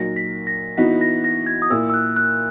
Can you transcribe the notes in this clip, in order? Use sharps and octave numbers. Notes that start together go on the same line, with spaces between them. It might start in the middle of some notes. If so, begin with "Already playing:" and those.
Already playing: A#2 F#3 A#3 D#4 F#4 A#6
B6
A#6
E3 B3 D#4 F#4 B6
A#6
A#6
G#6
D#6
A#2 A#3 E4 E6
E6
F#6
F#6